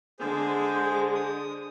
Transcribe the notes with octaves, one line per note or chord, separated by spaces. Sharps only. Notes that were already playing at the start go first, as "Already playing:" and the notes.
D3 G#3 G#4 C5
D#6